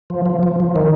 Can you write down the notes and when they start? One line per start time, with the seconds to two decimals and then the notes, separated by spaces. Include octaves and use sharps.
0.10 F3
0.26 F3
0.43 F3
0.60 F3
0.76 D#3